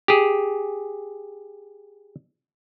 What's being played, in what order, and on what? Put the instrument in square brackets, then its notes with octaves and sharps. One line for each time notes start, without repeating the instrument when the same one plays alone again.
[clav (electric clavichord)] G4 G#4